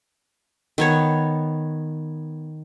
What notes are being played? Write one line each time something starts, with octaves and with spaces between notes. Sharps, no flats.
D#3 B3 C#5